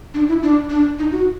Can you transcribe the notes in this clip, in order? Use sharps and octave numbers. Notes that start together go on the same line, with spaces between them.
D4
E4
D4
D4
D#4
F#4